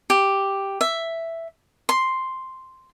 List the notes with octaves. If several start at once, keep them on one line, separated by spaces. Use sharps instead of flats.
G4
E5
C6